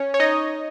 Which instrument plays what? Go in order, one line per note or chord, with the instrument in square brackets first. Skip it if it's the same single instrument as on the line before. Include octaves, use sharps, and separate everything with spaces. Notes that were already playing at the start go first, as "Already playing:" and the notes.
Already playing: [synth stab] C#4 C#5
C#5
D#4 D#5